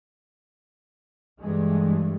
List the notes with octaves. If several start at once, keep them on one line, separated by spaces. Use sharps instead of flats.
G2 E3 G#3 A3